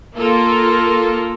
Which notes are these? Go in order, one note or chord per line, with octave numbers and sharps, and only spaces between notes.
A#3 F4 A4 A#4